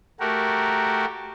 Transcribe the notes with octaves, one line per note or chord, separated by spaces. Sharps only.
A3 F#4 G4 A#4